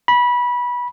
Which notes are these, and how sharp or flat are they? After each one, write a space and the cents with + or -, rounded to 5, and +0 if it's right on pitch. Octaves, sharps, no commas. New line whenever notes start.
B5 -20